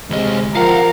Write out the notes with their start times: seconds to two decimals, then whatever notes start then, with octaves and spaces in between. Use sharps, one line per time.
0.10 D2 C3 G#3 D#5
0.55 F3 F4 A#4 F5 F#5